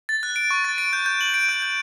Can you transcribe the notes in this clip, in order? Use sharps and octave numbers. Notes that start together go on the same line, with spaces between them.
A6
F#6
D7
C#6
A6
D7
G6
G6
F#7
D7
G6
G6